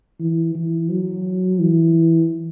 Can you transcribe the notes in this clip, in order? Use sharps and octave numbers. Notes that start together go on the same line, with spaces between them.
E3
E3
F#3
E3